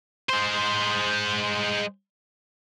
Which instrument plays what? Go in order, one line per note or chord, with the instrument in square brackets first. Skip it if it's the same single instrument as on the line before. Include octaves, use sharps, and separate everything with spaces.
[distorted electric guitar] G#3 C5